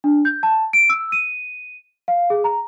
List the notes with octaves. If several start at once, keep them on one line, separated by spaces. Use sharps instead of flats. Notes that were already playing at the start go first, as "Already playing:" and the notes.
D4
G6
A5
D7
E6
D#7
F5
G#4
A#5